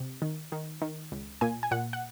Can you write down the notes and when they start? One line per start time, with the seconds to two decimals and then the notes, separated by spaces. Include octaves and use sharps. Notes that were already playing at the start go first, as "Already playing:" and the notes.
Already playing: C3
0.22 D#3
0.52 D#3
0.82 D#3
1.12 C#2
1.41 A#2 G#5
1.63 G#5
1.71 A#2 F#5
1.93 F#5